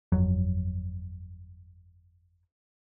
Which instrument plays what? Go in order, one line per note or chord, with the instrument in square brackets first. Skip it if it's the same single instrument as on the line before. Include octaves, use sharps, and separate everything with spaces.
[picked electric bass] G1 F2 F#3